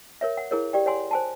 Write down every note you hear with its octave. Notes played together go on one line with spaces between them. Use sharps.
A#4 C#5 E5
F#5
E4 G#4 A#4 C#5
G4 D5 G5
C#5 F#5 G#5 C6
C5 G#5 A5